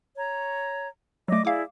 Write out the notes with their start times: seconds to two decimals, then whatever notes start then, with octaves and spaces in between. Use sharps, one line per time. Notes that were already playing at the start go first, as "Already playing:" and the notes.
0.16 C#5 A#5
1.28 F#3 A3 D5 D#5 D6
1.45 E4 G#4 D5 F5 D6